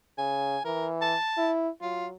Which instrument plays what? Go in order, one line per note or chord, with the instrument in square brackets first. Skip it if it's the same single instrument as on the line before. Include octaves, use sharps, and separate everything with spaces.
[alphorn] C#3 [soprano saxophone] G#5
[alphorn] E3 [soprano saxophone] A#4
[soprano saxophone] A5
[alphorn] E4
[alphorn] F#3 [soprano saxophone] F4